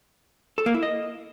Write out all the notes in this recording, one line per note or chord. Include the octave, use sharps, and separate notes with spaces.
A4
A#3
E4
D#5